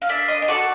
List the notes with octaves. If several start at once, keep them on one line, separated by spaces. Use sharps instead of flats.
F5
D4 E5
D#5
D#5
F#4 A4 D5